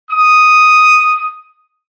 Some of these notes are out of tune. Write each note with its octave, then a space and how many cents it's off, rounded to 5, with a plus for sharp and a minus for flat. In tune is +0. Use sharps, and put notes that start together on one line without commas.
D#6 +0